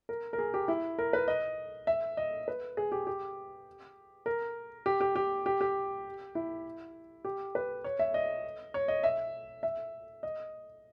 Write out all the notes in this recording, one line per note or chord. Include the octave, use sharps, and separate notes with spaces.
A#4
A#4
G#4
G4
E4
A#4
B4
D#5
E5
D#5
B4
G#4
G4
G4
A#4
G4
G4
G4
G4
G4
E4
G4
B4
C#5
E5
D#5
C#5
D#5
E5
E5
D#5